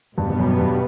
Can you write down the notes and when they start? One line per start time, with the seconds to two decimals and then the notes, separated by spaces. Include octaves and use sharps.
0.17 G2 B2 G3 B3
0.30 G2
0.39 F#2
0.59 G2